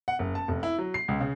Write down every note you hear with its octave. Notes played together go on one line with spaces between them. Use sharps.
F#5
F#1
A5
F1
E4
F#3
C7
C#2
C#3